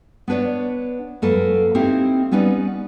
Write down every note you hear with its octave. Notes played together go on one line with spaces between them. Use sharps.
B3 D4 B4 C#5 D5
F#2 A#3 A4 B4
A#3 C4 D#4 E4 G4
G3 B3 C#4 D#4 B4 D5